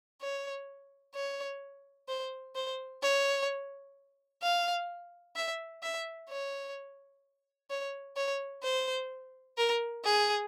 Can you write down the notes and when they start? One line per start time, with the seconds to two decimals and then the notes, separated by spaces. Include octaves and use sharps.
0.21 C#5
1.15 C#5
2.08 C5
2.55 C5
3.02 C#5
4.43 F5
5.36 E5
5.83 E5
6.29 C#5
7.70 C#5
8.16 C#5
8.63 C5
9.57 A#4
10.04 G#4